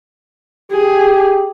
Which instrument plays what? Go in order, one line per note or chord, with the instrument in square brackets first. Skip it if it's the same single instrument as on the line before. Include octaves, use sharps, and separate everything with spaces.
[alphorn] G4 [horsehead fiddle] G#4